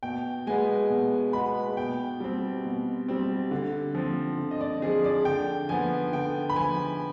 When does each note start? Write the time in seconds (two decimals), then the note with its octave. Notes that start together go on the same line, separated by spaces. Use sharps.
0.03 B2 G5
0.47 G#3 B3 G#5
0.90 B2
1.33 G#3 B3 B5
1.77 B2 G5
2.20 G3 C4
2.65 B2
3.09 G3 C4
3.51 D3
3.95 F3 C4
4.38 D3
4.51 D#5
4.61 D5
4.82 F3 C4 G#4
5.04 D5
5.25 D3 G5
5.69 F3 B3 G#5
6.12 D3 G5
6.50 B5
6.56 F3 B3 G#5